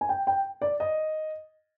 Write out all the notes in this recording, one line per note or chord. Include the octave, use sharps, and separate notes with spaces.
G#5
G5
G5
D5
D#5